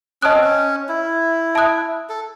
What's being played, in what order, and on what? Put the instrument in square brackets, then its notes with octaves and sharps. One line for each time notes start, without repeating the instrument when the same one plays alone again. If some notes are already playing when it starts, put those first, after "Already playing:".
[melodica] C#4 [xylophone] D#5 A5 D#6 F#6
[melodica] C4
C#4
E4
[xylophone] E5 A5 D#6 F#6
[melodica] A4